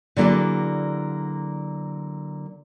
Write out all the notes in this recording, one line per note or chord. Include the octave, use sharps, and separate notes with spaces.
D3 F#3 A#3 E4 G#4 D5